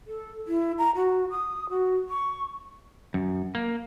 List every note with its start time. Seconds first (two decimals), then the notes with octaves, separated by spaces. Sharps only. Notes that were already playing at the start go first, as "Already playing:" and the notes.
0.07 A4
0.48 E4
0.78 A#5
0.96 F#4
1.30 D#6
1.70 F#4
2.09 C#6
3.14 F#2
3.55 A#3